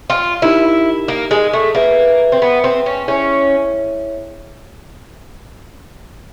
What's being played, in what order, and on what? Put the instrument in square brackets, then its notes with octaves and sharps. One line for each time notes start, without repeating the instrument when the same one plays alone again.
[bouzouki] F4
[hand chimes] D#4 G4 A#4 [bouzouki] E4
[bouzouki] A#3
G#3
A3
[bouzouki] A#3 [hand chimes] G#4 B4 E5
[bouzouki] C4
B3
C4
C#4
[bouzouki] C#4 [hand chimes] E4 G#4 C#5 E5 G5